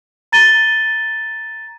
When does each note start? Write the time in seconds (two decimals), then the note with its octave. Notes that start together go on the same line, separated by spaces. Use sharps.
0.32 A#5 A6 D#7 G7